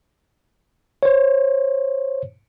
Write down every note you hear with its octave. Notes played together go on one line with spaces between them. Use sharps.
C5 C#5